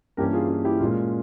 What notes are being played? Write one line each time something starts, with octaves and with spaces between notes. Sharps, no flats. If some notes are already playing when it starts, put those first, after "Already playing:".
G2 E3 A#3 C#4 G4 A#4
F4 G#4
F4
E4 G4
A#2 G#3 C#4 F4